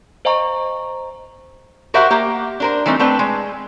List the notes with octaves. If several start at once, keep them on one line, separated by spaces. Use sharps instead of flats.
C5 D#5 F5 G#5 A#5 C#6
F#4 G4 A#4 C5 E5 F#5
A#3 G4
D4 A#4 C5
E3 G3 A3 C4 D#4
A3 C4 D4 B4 G5
G#3